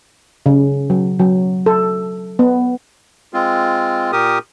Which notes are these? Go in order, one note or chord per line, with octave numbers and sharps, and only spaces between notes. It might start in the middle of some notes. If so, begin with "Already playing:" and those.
C#3
F#3
F#3
A4
B3
G#3 C4 F4
A#2 G4 A#4 D#6